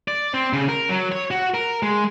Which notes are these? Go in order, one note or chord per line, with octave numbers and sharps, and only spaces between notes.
D5
C4
C#3
A#4
F#3
C#5
F#4
A#4
G#3